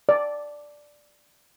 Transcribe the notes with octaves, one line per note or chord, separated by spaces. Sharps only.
D5